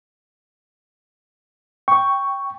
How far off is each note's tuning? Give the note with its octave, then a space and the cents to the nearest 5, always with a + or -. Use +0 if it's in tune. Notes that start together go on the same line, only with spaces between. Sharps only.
G5 +0 C#6 +5